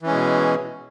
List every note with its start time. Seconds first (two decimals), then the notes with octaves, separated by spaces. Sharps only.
0.03 E3
0.06 C#4
0.10 G#3
0.14 B2